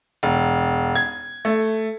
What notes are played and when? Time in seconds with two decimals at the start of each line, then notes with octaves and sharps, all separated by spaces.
0.23 E1
0.95 G#6
1.45 A3